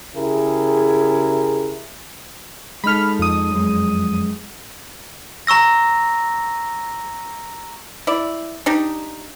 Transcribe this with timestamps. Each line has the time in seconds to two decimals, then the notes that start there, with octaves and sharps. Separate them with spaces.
0.15 C#3 E4 G4 G#4 A#4
2.84 G#3 D#4 A4 B5 F6
3.19 F2 D#6
3.51 F#2 G#3
5.47 A#5 C#6 E6 A#6
8.07 E4 D5
8.66 D4 D#4 G4